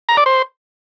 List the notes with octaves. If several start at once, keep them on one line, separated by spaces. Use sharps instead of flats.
A#5
D5
C5